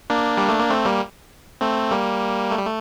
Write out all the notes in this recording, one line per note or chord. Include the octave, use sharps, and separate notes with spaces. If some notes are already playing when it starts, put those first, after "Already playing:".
A#3 D4
G3
A3
A#3
A3 C4
G3 A#3
A3 C4
G3 A#3
A3
G3
A3